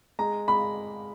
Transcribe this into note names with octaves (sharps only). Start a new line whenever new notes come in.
G#3 A#5
G#3 B5